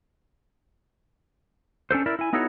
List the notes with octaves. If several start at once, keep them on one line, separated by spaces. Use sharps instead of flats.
C#4 D4 A4 C5
E4 A#4 D5 E5
E4 G#5
B3 D#4 E4 F#4 A4 C#5